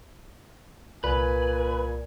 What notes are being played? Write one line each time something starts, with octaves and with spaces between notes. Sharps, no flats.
C2 A#2 B4 G#5